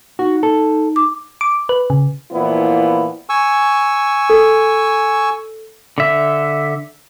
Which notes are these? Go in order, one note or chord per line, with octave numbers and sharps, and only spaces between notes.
D#4 F#4
A4
D6
D6
B4
C#3
A#2 E3 F3 B3 E4
G#5 C#6 E6
A4
D3 E5